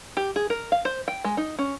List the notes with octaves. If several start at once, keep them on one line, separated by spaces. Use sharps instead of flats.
G4
G#4
A#4
F5
C5
G5
G#3
D#4
C#4